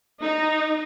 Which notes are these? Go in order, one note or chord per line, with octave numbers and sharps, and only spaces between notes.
D#4